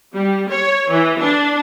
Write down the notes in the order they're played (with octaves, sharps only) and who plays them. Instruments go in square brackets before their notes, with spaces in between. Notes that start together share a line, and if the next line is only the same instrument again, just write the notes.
[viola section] G3
C#5
E3
D4